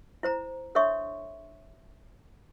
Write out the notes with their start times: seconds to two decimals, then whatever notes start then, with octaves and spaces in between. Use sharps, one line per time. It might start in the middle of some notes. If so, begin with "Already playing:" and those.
0.23 E4 C5 A#5
0.75 D4 A4 C#5 E5 C6 C#6